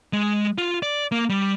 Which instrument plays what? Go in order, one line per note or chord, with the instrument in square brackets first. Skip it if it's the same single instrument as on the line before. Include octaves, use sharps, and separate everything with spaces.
[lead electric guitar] G#3
F4
D5
A#3
G3